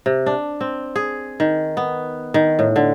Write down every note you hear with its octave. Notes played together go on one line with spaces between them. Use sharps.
C3
D4
C4
G#4
D#3
B3
D#3
A2
D3